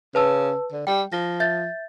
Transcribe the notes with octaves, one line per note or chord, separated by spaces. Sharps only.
C#3 B4 A5 E6
D3
G3 G5
F3 A#6
E5 G6 A6